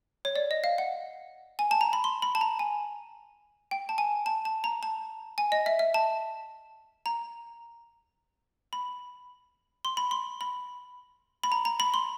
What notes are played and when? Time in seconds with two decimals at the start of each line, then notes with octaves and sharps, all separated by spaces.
0.25 C#5
0.36 D5
0.51 D#5
0.64 F5
0.78 F#5
1.59 G#5
1.71 A5
1.81 A#5
1.93 B5
2.04 C6
2.22 B5
2.35 A5
2.41 A#5
2.59 G#5
3.71 G5
3.89 A5
3.98 G#5
4.26 A5
4.45 A5
4.64 A#5
4.83 A5
5.38 G#5
5.52 D#5
5.66 E5
5.79 E5
5.94 A5
7.06 A#5
8.73 B5
9.85 C6
9.97 B5
10.11 C6
10.41 B5
11.43 B5
11.52 A#5
11.65 A#5
11.80 B5
11.94 C6